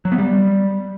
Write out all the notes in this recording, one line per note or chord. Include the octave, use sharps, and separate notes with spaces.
F#3
B3
G3